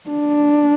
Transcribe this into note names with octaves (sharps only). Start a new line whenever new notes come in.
D4